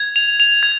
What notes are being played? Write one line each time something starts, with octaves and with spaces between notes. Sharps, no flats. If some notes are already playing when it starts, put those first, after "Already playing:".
Already playing: G#6
F7
F7
G#6